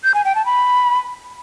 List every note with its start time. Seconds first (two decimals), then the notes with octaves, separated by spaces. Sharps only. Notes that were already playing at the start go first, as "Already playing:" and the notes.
0.04 G6
0.14 G#5
0.25 G5
0.35 A5
0.46 B5